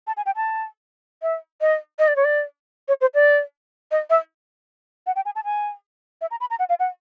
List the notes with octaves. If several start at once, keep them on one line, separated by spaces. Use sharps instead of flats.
A5
G#5
G5
A5
E5
D#5
D#5
D5
C#5
D5
C#5
C5
D5
D#5
E5
F#5
G5
G#5
A5
G#5
E5
A#5
B5
A#5
F#5
F5
F#5